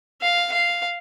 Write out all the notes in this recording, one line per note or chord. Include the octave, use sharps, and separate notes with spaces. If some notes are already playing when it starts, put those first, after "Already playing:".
F5
F5